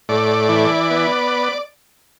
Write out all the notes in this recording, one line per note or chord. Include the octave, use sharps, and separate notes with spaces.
A2 D5
E3
B3